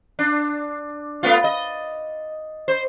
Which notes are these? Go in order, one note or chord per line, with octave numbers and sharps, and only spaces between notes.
D4
A3 B3 F4
D#5
C5